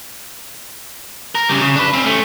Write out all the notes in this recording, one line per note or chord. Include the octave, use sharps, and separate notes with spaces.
A#4
C#3 G3
C#3
D4 B4
C4 C#4
A3 C#4